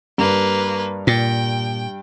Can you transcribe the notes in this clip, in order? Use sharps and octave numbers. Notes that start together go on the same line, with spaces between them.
G2 A#3 B4
A#2 G5